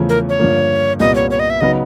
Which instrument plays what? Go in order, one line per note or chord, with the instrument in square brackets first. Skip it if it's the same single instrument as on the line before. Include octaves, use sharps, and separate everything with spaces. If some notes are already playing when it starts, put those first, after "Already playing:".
Already playing: [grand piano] E2 C#3 F3 A3 C#4
[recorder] A#4
C#5
[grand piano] G2 D3 F3 A#3
[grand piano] C2 A#2 G3 B3 [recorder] D#5
[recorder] C#5
C#5
D#5
E5
[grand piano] C#3 F#3 B3 D#4 [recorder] D#5